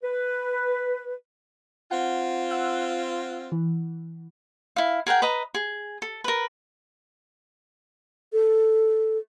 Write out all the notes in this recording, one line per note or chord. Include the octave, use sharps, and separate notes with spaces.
B4
C4 F4 F#5
F#5 E6 F#6
E3
E4 F5
G#4 A#4 F#5 G5
B4 D#5 A#5 B5
G#4
A4
A#4 B4
A4